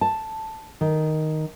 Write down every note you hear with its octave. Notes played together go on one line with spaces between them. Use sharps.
A5
D#3